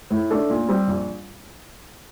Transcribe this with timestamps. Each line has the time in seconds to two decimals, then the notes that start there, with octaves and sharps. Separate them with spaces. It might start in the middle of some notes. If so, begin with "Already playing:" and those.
0.11 A2
0.31 A3 D4 A4
0.50 A#2
0.69 G3 C4
0.87 A#1